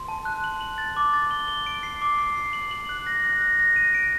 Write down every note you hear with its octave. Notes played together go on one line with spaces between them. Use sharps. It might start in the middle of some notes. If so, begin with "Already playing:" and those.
Already playing: C6
A5
F#6
F#7
F#7
A6
D6
A6
G7
G7
D7
C7
D6
C7
C7
F#7
F#7
F#6
A#6
F#6
A#6
A#6
D#7
D7